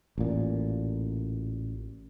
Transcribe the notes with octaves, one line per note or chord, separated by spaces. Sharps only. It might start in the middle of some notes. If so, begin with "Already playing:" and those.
A1 A#2